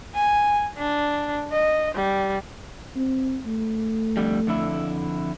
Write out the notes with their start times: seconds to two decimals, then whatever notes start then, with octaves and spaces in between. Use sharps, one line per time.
0.14 G#5
0.78 D4
1.52 D#5
1.95 G3
2.96 C4
3.46 A3
4.17 F2 D3 G3
4.47 F2 D3 E4